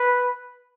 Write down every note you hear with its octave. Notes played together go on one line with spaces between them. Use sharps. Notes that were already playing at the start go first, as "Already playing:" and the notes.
Already playing: B4